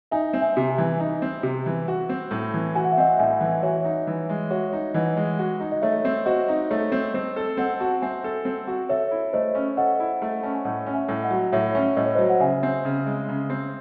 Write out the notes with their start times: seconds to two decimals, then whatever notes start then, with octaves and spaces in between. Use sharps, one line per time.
0.11 D#4 E5 G#5
0.33 C4
0.41 E5 G#5
0.57 C3
0.70 E5 G#5
0.78 E3
1.00 D#4 E5 G#5
1.22 C4
1.43 C3
1.66 E3
1.88 F#4
2.09 C4
2.31 A2
2.54 E3
2.75 F#4 G#5
2.84 F#5
2.92 E5
2.97 C4 D#5 F#5
3.19 A2 E5 G#5
3.41 E3
3.63 F#4 C#5 E5
3.84 D#4
4.07 E3
4.29 G#3
4.51 F#4 C#5 E5
4.73 D#4
4.94 E3 D#5 F#5
5.17 G#3
5.39 F#4
5.60 D#4
5.72 D#5
5.82 A3 C#5 E5
6.05 C4
6.26 F#4 C5 D#5
6.48 D#4
6.70 A3 C#5
6.92 C4
7.14 C4 C5 D#5
7.36 A4
7.57 C4 D#5 F#5
7.80 F#4 F#5 A5
8.02 C4 E5 G#5
8.24 A4
8.45 C4
8.68 F#4
8.89 A4 C#5 E5
9.11 E4
9.33 A3 C5 D#5
9.55 C#4
9.77 A4 D#5 F#5
10.00 E4
10.22 A3
10.43 C#4 A5
10.54 G#5
10.65 A2 D#5 F#5
10.86 C#4
10.94 E5 G#5
11.08 A2
11.23 D#5 F#5
11.30 F#3
11.52 A2 C#5 E5
11.75 C#4
11.97 A2 D#5
12.06 C#5
12.15 F#3 C5 D#5
12.30 F#5
12.40 C#3 E5 G#5
12.63 C4
12.85 C#3
13.06 G#3
13.29 C#3
13.50 C4